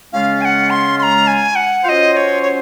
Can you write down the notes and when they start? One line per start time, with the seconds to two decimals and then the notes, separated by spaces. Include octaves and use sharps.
0.12 C#3 G#3 C#4 F4 F5
0.41 G#5
0.45 F#5
0.70 C6
0.99 C6
1.03 A#5
1.27 G#5
1.56 F#5
1.85 F#3 C#4 F4 C5 D#5 F5
2.13 D#5
2.17 C#5
2.43 C#5